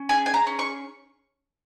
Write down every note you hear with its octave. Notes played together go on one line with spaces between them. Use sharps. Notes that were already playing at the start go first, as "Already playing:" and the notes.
Already playing: C#4
G#4 G#5
G#5
A#5
C#4
C#6